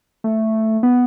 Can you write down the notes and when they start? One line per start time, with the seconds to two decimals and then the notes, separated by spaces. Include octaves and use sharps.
0.24 A3
0.83 B3